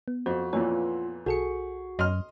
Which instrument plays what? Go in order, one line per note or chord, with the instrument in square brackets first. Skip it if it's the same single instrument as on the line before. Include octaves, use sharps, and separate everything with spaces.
[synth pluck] B3
[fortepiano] F2 [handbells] F#4 [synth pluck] C5
[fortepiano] F2 A#2 E3 [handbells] B3 F4 [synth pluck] C#5
[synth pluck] B1 A4 C#7 [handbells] F#4 [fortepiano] G#4
[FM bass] F#2 [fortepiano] D#5 C6 F6